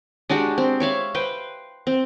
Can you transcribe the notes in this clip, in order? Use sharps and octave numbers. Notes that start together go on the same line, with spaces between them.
G#3 D4 F#4 G4
C4
C#5 E5 F5 B5
B4 C5 G5
C4